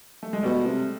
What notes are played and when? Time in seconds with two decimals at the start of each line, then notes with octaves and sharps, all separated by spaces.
0.23 A3
0.33 G#3
0.43 B2 G3 A3
0.66 C3